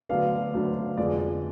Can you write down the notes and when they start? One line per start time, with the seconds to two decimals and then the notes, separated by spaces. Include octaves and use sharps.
0.09 D2 D3 F#3 B3 D4 F5
0.54 D2 D3 F#3 B3 D4
0.97 F1 F2 D3 G#3 B3 D5
1.19 D5